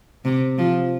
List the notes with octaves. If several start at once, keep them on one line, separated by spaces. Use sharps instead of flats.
C3
F3